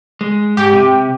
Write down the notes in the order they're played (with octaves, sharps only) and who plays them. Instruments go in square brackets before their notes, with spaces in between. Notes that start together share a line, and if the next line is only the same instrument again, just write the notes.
[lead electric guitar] G#3
[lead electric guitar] G#2 [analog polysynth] G4
[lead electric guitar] C3